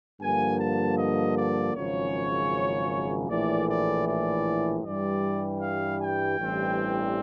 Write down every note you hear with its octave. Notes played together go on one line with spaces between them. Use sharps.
G2 D3 F3 A#3 G#5
A5
D#5
D5
G#1 F#2 C#3 F3 C#5
A#1 A2 E3 A3 D5
D5
D5
G2 E3 G3 D5
F5
G5
A1 G2 E3 G3 C4